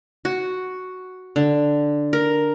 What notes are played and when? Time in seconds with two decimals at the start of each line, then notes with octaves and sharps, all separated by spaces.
0.25 F#4
1.36 D3
2.13 A#4